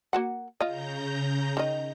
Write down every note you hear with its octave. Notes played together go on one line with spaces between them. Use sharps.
A#3 F#4 F#5
C#3 F4 D#5 A#5 G6
D#3 D#5